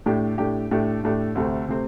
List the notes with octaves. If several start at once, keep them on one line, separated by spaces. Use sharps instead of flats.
A2 A3 D4 G4
A2 A3 D4 G4
A2 A3 D4 G4
A2 A3 D4 G4
D2 C3 A3 C4
C3 A3 C4